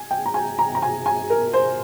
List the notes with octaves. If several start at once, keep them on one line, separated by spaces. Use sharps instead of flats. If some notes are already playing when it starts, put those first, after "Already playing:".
Already playing: G#5
G5
A#5
G#5
A#5
A#5
G#5
G#5
A#4
C5